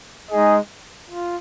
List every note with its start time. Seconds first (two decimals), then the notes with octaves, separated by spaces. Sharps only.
0.31 G#3 D#4 G#4 D#5
1.09 F4